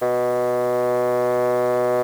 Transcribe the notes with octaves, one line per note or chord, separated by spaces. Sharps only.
B2